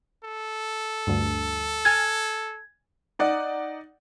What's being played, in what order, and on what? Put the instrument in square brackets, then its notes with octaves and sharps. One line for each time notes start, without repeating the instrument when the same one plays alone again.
[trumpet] A4
[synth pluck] D2 G2
[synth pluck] G#5 F6 A6 [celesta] G#6
[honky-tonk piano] D#4 D5 F#5